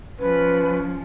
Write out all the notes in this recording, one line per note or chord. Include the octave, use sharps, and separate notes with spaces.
F3 C#4 B4